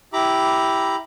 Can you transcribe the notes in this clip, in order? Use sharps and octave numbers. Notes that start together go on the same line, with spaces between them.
E4 G4 A#5 B5 D6